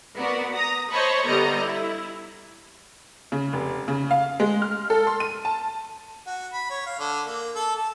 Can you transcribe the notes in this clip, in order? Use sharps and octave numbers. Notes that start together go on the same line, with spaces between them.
B3 F#4 A#4 D5
A#5 D#6 A#6
C5 C#5 D#5 A5 B5 C#6
D3 G3 B3 D#5 A#5
E4
C#3
F1
C#3
F5
G#3
F6
A4
C6
D#7
A5
F#4
B5
C#5
F5
D3
A#3
A4
A5